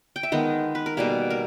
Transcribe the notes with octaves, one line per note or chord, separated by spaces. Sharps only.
G5
E5
D#3 G#3 B3 D#5
B4
A#4
B2 G3 A#3 G#4
A#4